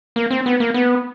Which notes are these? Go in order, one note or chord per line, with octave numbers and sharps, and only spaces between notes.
A#3
C4
B3
A#3
B3